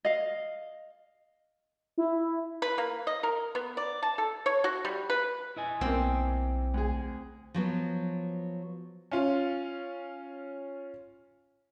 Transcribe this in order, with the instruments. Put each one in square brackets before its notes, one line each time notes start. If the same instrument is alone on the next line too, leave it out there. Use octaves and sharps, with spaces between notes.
[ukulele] D#5 F5
[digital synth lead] E4
[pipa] B4
A#3
D#5
A#4
B3
D5
A5
A4
C#5
F#4
G3
B4
[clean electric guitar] E4 D#5 G#5
[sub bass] B1 [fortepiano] E2 A#3 [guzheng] C4 G5
[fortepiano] D2 G#4
[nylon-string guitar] F3 F#3 B3
[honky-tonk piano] C#4 F4